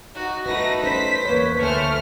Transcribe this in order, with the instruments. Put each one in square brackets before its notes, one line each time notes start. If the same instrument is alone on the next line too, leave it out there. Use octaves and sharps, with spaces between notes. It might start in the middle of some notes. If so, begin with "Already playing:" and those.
[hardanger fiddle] D#4 F#4
[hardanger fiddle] A3 [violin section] D#4 B4 A#6 [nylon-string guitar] F#4
[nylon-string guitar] C#4 B4 [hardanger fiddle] C5 [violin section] B6
[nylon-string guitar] E2 A#3 [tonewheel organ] B4 C#5
[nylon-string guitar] D2 G#5 [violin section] A3 F6 [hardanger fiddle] C5 [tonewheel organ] C#6